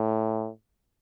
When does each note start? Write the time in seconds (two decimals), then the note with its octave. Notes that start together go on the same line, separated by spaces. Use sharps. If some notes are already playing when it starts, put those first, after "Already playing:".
Already playing: A2